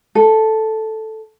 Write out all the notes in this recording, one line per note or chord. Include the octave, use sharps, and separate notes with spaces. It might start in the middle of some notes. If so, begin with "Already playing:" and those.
A4